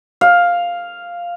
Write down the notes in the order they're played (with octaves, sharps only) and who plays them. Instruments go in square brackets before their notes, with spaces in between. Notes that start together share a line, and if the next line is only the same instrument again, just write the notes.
[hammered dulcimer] F5